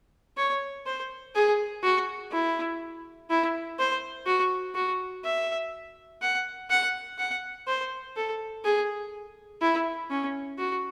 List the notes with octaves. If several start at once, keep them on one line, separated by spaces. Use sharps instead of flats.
C#5
C5
G#4
F#4
E4
E4
C5
F#4
F#4
E5
F#5
F#5
F#5
C5
A4
G#4
E4
C#4
F#4